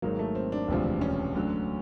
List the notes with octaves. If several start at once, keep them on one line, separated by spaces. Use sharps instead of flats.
G#1 G#2 D#3 F#3 A#3
A3
C4
D4
E1 D2 C3 F3
C#4
D2 D3 F#3